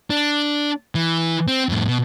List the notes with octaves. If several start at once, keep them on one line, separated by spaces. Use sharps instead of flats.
D4
E3
C4
F2 A2
B2